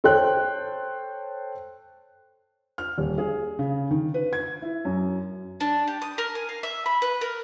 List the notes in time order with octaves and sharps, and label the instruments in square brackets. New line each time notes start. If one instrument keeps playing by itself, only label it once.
[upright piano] A4 C5 C#5 G5 F#6
[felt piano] F6
D#1
G#4
C#3
D#3
B4
G#6
E4
F#2
[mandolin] D4
G4
D#6
A#4
G#5
F5
E5
B5
B4
A#4